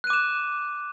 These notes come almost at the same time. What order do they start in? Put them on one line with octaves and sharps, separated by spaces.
F#6 D#7 D6 E7